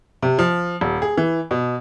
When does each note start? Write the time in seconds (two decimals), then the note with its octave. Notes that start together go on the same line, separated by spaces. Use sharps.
0.23 C3
0.39 F3
0.81 D#1
1.02 G#4
1.17 E3
1.51 B2